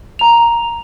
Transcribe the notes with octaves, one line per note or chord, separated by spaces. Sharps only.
A#5 F7